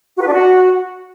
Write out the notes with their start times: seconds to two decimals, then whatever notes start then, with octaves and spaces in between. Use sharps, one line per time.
0.16 F#4
0.22 B4
0.27 D4
0.33 F#4